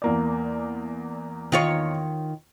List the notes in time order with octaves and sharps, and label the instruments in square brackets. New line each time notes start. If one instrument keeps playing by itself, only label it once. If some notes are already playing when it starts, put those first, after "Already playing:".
[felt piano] E2 A#3 D5
[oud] D#3 F4 C#5